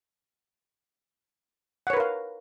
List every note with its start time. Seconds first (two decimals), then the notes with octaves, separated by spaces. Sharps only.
1.87 F#5
1.90 C#5
1.93 B4
1.97 A#4
2.00 F5